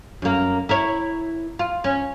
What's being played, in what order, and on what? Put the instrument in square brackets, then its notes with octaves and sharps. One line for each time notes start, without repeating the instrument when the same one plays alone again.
[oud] F#2 A#3
E4 A#4 C#5
F4
C#4